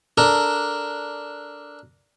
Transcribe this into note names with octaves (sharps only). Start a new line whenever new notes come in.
D4 A4 A#4